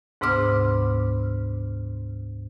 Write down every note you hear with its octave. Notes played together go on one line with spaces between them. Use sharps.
D2 G#2 C3 B3 D6 F6